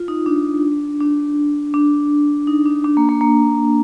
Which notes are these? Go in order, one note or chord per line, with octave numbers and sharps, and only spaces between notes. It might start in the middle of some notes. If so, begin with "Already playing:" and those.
Already playing: F4
D#4
D4
D4
D4
D#4
D4
D4
A#3
A#3
A#3